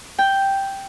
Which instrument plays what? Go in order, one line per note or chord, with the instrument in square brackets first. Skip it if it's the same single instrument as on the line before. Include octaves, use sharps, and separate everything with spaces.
[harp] G5